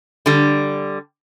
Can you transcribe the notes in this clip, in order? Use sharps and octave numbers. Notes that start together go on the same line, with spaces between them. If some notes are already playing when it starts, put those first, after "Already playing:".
D3 G3